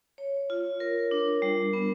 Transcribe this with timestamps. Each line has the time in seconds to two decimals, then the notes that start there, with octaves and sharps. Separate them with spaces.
0.18 C#5
0.50 F4
0.80 A#4
1.11 D4
1.42 G3
1.73 B3